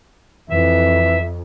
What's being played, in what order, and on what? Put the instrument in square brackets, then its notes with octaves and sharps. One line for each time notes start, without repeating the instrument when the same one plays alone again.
[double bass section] F2 [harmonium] E3 [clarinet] E5